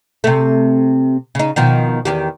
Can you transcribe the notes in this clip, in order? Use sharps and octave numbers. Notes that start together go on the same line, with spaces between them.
C3 A3
C#3 D#4
B2 D#3 F3
E2 D#3 G4